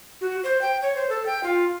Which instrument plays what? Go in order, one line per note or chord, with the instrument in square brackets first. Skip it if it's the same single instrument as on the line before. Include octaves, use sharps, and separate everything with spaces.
[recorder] F#4
C5
G5
C#5
C5
A4
G5
F4